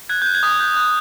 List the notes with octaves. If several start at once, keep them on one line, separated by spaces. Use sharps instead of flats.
F#6 G#6
F#6 G6
G#6
D#6
F#6 G6
F#6